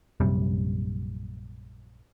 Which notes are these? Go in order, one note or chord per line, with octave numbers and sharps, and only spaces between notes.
A#1 F#2 C3 G3